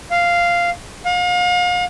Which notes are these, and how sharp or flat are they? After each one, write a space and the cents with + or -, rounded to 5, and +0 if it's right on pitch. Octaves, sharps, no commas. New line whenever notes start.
F5 -5
F5 +40